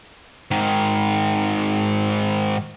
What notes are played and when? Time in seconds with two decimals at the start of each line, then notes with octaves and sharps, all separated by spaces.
0.51 G#2 D#3